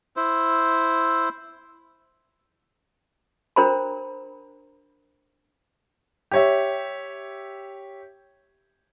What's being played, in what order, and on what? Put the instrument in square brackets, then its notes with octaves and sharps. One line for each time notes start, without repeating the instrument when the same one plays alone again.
[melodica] E4 C5
[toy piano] D4 A#4 C5 A#5 B5
[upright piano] G4 C#5 E5